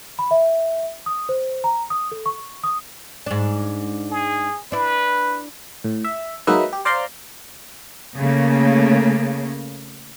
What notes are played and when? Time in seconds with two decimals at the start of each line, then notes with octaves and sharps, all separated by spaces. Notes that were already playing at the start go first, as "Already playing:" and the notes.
0.19 B5
0.31 E5
1.06 D#6
1.29 C5
1.64 A#5
1.90 D#6
2.12 A4
2.26 C#6
2.64 D#6
3.26 G#2 D4
4.11 G#4
4.72 D4 E4 B4
5.84 A2
6.04 E5
6.47 F#3 G#3 A#3 D#4 B4 E5
6.73 G4
6.85 C5 D5 F5 A#5 C6
8.17 C#3 A3 A#3